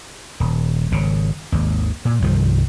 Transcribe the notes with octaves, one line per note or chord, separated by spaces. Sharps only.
D#1
G#1 C#3
G#1 D#2
A#2
C2 G2 D#3 F3